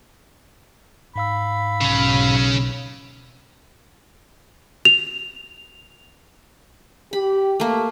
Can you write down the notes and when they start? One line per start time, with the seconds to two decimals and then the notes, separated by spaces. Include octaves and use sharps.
1.16 G#2 F5 B5 E6
1.81 B1 C#3 C#4
4.85 F7
7.13 G4 B5
7.60 A3 A#3